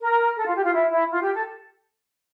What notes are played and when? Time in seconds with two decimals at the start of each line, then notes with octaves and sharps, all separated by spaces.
0.01 A#4
0.37 A4
0.46 F4
0.55 G4
0.64 F4
0.74 E4
0.92 E4
1.10 F4
1.21 G4
1.34 A4